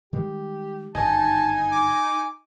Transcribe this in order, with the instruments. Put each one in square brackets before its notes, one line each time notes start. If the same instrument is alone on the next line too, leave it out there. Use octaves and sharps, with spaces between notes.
[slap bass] D#3 G3 G#3 [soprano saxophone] G4
[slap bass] G1 F#2 D#3 [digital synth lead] D#4 [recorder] G#5 [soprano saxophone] A5
[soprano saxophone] D6